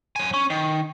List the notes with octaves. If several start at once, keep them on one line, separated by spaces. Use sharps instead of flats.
F#3 G#5
C#4
D#3